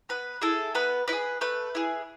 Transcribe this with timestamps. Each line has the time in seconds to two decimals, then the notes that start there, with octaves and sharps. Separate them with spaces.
0.09 B3 B4
0.42 E4 G#4 A4
0.75 B3 B4
1.08 E4 B4
1.13 G#4
1.41 A3 B4
1.75 E4 G#4